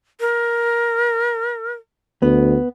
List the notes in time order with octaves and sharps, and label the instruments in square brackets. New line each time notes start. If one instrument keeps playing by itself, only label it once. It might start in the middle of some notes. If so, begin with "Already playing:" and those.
[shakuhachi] A#4
[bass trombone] D2 [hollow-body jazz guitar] B3